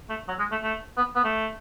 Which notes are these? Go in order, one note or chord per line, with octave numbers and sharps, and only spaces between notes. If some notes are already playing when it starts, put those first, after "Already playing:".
A3
F#3
G#3
A3
A3
B3
B3
A3